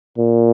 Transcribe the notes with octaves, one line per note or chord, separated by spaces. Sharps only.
A#2